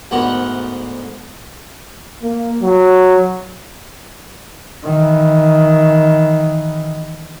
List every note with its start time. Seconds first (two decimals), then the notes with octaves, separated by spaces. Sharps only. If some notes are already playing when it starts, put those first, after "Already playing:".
0.11 D2 G#2 B3 A#4 B4 F#5
2.22 A#3
2.62 F#3
4.83 D#3 E3